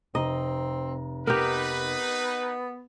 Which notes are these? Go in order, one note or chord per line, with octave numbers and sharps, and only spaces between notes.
F1 C4 D#5 A#5
B3 D#4 G4 A#4 B4